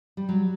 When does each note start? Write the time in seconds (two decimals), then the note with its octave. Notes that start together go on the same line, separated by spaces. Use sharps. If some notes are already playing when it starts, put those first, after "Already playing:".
0.17 G3
0.29 F#3